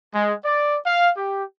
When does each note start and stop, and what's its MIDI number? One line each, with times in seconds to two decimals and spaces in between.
0.14 0.33 56
0.45 0.78 74
0.86 1.10 77
1.17 1.43 67